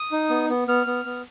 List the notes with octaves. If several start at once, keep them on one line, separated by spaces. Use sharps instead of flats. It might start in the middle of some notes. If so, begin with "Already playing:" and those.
Already playing: D#6
D#4
B3
B3
B3 F6
B3
B3